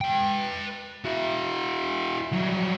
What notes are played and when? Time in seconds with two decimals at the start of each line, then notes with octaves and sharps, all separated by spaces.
0.01 B4 G5
1.04 E4 F#4
2.33 F#3 G3